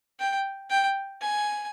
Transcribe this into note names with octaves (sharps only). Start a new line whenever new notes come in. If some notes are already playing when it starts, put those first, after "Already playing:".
G5
G5
G#5